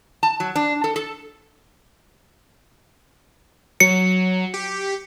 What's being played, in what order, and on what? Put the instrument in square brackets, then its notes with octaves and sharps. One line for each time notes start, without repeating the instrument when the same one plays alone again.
[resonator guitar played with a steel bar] A5
F#3
D4
A4
A4
[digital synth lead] F#3 [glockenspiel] C#7
[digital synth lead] G4